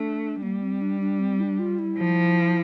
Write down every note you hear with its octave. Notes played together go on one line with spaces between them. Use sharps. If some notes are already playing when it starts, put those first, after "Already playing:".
Already playing: A3 D4
G3 A#3
C4
D4
D4
C4
E4
D4
F4
E4
F3